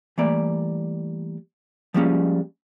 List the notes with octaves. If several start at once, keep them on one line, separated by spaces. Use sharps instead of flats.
E3 G3 A3 A#3 D5
F3 G3 G#3 A#3 C4 C#4